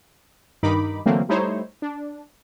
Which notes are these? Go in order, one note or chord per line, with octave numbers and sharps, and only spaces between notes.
G2 D#3 D#4 B5 D6
D3 E3 F#3 A3 A#3 C4
G3 A3 D#4 E4 C5 C#5
D4